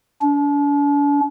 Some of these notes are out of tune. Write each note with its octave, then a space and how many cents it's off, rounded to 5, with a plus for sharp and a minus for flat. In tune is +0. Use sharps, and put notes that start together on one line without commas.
D4 -40